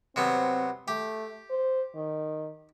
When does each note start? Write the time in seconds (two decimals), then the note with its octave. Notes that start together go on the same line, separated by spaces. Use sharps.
0.16 C3 F#3 B3 C4
0.88 A3 G4
1.51 C5
1.96 D#3